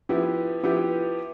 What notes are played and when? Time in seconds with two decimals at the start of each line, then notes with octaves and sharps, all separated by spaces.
0.09 F3 B3 E4 G4
0.63 F3 B3 E4 G4